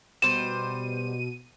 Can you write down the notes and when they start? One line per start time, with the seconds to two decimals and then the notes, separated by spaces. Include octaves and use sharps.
0.22 B2 G3 C5 D#7 E7